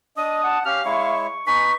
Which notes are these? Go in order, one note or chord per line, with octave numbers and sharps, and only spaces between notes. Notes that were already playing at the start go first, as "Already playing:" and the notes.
D4 D#5 D#6
F#5 A5
C#4 G4 F5 F6
G#3 E4 C#5 E5 C#6
D#4 B4 G#5 C#6 B6